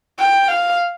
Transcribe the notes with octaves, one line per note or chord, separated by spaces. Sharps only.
G5
F5